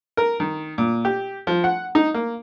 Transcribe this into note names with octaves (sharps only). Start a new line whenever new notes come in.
A#4
D#3
A#2
G4
F3
F#5
D#4
A#3